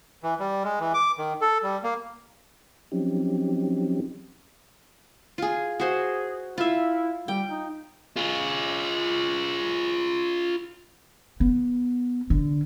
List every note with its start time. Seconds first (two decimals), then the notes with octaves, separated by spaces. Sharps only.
0.23 E3
0.40 G3
0.64 G#3
0.80 E3
0.94 D6
1.18 D#3
1.41 A4
1.63 G3
1.84 A#3
2.92 F3 F#3 C4 C#4 D#4 G4
5.38 F4 G#4
5.80 F#4 G#4 C5
6.58 E4 F4 E5
7.28 G3 G5
7.50 D#4
8.16 F4 G#4
11.40 B3
12.30 D3